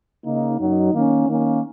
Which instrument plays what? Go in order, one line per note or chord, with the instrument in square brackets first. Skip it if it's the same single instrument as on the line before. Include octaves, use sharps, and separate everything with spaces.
[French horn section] C#3 A#3 D#4
F#2 F#3 D#4
D#3 A#3 C#4
D#3 A#3 C#4